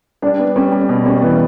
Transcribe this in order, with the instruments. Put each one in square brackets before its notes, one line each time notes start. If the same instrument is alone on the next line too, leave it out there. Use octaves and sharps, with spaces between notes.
[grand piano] G3 [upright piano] D4
[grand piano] B3
[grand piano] G3 [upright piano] C#4
[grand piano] G3
B2
[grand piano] G3 [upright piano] C#4
[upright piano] E3 [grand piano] B3